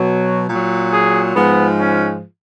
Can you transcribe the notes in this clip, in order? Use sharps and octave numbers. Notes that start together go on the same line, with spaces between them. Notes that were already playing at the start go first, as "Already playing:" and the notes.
Already playing: B2 F#3
A#2 F#3
G#4
G#2 F3 G#3 B3
C#4